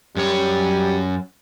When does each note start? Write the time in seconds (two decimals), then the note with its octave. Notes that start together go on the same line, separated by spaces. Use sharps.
0.17 F#2 G3 C#5